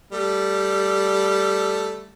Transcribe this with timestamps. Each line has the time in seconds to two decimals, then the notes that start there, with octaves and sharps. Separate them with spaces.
0.12 G3 A3